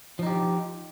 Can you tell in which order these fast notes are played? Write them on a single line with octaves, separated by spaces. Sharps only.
F3 D#4 G4